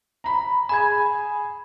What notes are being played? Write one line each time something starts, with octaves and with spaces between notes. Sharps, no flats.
A#5 B5
G#4 G#5 B5 G#6